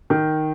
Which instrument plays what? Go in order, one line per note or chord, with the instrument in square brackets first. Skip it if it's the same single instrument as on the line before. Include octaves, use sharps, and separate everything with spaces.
[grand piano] D#3